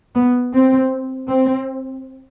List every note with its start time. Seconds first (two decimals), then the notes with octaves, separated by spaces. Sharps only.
0.14 B3
0.53 C4
1.29 C4